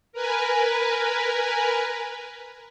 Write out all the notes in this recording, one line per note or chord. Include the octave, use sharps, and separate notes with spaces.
A#4 B4 G#5